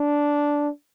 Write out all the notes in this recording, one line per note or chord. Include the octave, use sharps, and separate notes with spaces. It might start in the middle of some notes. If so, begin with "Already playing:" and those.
Already playing: D4